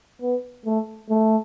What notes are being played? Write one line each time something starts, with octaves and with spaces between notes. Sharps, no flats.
B3
A3
A3